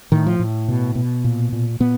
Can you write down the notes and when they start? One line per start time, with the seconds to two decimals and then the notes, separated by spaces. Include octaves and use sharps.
0.12 A2 D#3
0.26 F3
0.39 A2
0.68 B2
0.95 B2
1.24 A#2
1.53 A#2
1.80 A#2 B3